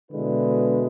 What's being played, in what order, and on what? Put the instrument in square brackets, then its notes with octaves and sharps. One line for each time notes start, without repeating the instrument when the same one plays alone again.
[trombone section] B2 D3 G#3 E4 B4